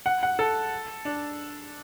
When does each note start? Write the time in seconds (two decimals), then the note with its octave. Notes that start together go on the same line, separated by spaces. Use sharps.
0.06 F#5
0.23 F#5
0.39 A4
1.05 D4